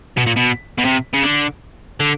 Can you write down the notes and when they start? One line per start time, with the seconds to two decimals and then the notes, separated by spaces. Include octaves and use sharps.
0.17 B2
0.26 A#2
0.36 B2
0.78 B2
0.85 C3
1.14 C#3
1.23 D3
2.00 D3